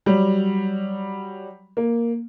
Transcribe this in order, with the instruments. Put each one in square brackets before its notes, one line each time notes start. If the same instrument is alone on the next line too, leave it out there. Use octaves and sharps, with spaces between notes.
[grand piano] F#3 G3
A#3